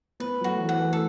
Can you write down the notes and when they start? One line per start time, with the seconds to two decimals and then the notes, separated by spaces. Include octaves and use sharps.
0.20 B3 B4
0.41 F#3
0.44 A3 F#4
0.56 E3
0.68 E3 F#5
0.80 E3
0.93 A3 A4